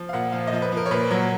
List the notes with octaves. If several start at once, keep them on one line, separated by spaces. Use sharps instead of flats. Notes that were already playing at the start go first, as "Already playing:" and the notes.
Already playing: F3
F5
A#2 F#5
F3 F5
D#5
F3
B4
F3 A#4
C#5
A#2 B4
F#3